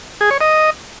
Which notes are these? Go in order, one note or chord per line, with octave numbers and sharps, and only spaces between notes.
G#4
C#5
D#5